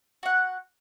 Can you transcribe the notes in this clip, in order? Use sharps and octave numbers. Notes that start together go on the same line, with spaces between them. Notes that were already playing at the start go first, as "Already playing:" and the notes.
F#4 F#5